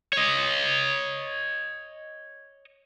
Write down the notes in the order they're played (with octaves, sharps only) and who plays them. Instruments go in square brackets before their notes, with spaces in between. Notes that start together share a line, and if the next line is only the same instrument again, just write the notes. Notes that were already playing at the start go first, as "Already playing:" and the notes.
[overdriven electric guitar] C#5 D#5